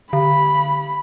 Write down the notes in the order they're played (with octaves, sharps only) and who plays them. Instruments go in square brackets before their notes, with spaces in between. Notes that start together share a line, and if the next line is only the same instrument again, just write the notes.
[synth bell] D3 [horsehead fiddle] B5